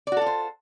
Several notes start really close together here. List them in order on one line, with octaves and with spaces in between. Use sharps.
D5 F#4 A4 F4 C5